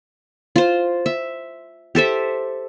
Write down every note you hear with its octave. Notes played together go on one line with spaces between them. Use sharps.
F4 C5
E5
G4 A4 C5 E5